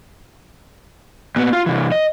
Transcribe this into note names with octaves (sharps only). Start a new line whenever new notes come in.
A#2 B3
F4
C3 E3
D#5